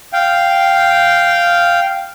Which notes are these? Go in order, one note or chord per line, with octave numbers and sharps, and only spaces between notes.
F5 G5